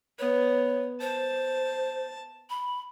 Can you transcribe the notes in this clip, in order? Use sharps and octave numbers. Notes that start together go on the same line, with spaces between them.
B3 C#5
C5 A5
B5